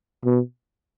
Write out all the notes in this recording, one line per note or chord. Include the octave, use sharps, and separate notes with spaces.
B2